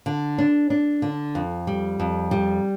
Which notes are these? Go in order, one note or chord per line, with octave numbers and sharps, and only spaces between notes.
D3
D4
D4
D3
F2
G3
F2
G3